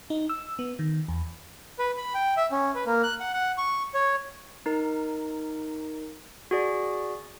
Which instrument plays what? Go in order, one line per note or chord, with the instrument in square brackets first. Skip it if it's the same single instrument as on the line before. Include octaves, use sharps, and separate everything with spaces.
[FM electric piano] D#4
E6
B3
D#3
E2
[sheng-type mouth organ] B4
B5
G5
E5
C#4
B4
A#3
F#6
F#5
F#5
C#6
C#5
[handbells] D#4 A#4
F#4 G#4 D5